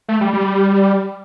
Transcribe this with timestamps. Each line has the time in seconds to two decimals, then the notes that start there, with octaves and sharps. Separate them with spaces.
0.09 A3
0.21 G3
0.33 G3